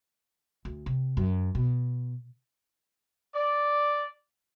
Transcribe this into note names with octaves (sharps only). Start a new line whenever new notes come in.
D2
C3
F#2
B2
D5